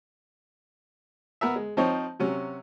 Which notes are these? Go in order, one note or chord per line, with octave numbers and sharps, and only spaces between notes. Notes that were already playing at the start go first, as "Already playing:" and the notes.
B3 A#4 E5
G#3
F3 C4 D#4 C#5
C3 F#3 C#4